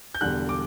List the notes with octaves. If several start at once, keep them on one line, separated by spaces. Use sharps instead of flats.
G6
E1 E2 D3 G3 F#6
D6